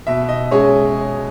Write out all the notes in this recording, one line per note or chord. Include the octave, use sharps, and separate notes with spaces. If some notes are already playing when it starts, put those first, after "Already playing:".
B2 E5
D#5
G#3 C#4 G#4 C#5